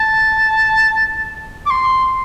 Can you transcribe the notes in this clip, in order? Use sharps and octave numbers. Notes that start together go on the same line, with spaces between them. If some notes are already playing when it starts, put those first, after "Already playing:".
Already playing: A5
D6
C6